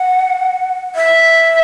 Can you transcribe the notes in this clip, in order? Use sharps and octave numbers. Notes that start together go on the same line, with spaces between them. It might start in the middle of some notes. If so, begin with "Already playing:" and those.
Already playing: F#5
E5